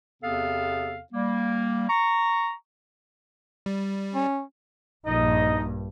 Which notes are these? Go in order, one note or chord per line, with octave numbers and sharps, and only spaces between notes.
E2 C3 B3 C4 A4 F5
G3 A#3
A#5 C#6
G3
C#4
A#1 G2 D#4 D#5